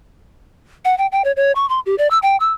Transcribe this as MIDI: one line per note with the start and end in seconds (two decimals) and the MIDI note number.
0.85 0.97 78
0.98 1.07 79
1.12 1.22 79
1.25 1.32 73
1.37 1.52 73
1.55 1.68 85
1.69 1.80 84
1.86 1.95 67
1.98 2.08 74
2.11 2.18 88
2.23 2.37 79
2.40 2.53 88